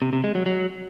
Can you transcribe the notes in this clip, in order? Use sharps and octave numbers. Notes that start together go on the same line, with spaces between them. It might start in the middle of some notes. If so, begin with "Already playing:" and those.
C3
C3
G#3
F#3
F#3